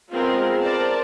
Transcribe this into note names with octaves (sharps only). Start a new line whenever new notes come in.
G#3 B3 C4 F4 A#4
A#4 C5 D5 A5